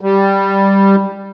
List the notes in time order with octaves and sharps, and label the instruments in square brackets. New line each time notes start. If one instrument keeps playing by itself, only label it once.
[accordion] G3